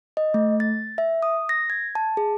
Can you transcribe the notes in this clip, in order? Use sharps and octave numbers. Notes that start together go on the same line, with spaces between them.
D#5
A3
A6
E5
D#6
A#6
G#6
A5
G#4